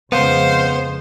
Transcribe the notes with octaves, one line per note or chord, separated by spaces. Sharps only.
F2 C#3 G#3 B3 C5 F5